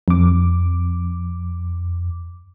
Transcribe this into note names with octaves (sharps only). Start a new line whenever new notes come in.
F2 D6